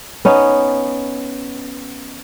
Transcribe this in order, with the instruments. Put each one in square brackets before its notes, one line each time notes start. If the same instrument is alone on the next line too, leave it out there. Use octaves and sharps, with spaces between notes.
[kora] B3 C#4 D#4